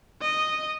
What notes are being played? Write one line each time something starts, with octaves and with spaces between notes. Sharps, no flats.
D#5